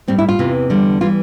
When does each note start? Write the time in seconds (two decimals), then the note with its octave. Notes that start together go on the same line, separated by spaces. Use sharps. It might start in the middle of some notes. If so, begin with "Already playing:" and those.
0.08 A2 G3 C4
0.18 E4
0.29 F4
0.39 E2 C3 E3
0.70 E2 D3 G3
1.01 E3 G3 F4